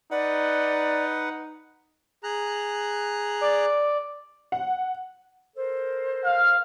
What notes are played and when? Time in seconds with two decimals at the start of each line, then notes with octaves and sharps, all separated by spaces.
0.11 D#4 B4 D5 F#5
2.24 G#4 A#5 F#6
3.41 D5
4.52 F#5
5.57 A4 A#4 C5
6.24 F5